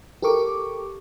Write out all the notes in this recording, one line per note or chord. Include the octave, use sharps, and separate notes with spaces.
G4 A4 A#4 C#6 D6